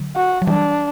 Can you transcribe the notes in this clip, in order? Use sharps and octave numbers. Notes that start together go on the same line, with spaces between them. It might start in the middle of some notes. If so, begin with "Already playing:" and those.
Already playing: D3 F#3
F#4
F#3
E3 G3 D4